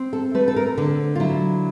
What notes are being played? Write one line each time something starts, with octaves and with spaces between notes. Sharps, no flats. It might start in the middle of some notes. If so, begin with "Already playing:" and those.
Already playing: C4
A4
A3 B4
A4
A#4
D3 A4
F4
F#3 E4